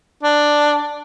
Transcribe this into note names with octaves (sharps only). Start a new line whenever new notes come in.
D4